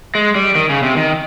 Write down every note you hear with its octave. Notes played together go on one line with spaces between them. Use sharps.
G#3
G3
D#3
C#3
C3
D#3